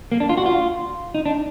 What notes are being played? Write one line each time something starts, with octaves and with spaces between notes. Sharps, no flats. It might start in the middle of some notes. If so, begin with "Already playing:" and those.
A#3
D4
F4
F#4
F4
D#4
D4